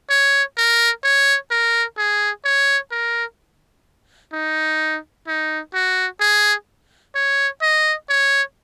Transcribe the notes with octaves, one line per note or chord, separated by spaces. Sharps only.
C#5
A#4
C#5
A#4
G#4
C#5
A#4
D#4
D#4
F#4
G#4
C#5
D#5
C#5